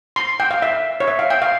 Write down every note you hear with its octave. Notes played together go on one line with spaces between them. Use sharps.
C6
G5
F5
E5
C#5
E5
F5
G5
F5